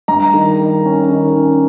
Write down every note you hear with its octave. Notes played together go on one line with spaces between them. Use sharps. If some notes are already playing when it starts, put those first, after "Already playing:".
G2 A#5
D#3
D#3
C#4
D#3
C#4